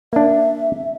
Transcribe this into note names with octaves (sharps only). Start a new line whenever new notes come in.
A#3 D4 E5